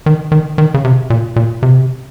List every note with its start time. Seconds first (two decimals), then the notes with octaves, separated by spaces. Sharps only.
0.06 D#3
0.32 D#3
0.58 D#3
0.74 C#3
0.84 C3
1.10 A#2
1.36 A#2
1.63 C3